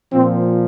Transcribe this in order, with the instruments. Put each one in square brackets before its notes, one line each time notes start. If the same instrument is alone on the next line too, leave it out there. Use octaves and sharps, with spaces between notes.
[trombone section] A#2 F3 C4